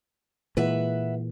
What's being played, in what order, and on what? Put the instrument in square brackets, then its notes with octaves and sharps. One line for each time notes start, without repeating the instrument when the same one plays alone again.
[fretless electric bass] A#2 E3 G#3 [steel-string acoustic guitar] B4 E5 F#5